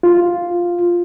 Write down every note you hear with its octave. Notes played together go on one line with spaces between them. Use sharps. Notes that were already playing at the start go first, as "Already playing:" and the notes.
F4